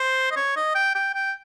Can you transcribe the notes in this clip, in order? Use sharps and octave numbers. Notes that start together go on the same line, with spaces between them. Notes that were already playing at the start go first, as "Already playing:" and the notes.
Already playing: C5
D#5
C#5
D#5
G5
G5
G5